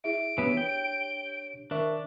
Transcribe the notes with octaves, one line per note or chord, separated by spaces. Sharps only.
E4 G#4 E5 D7
E3 B3 D4 G4 C#5
G5
D#3 D4 A#4 E5 C#6